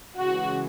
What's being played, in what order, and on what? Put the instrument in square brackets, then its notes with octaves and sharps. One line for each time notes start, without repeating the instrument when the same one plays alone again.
[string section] C#3 E3 G#3 F#4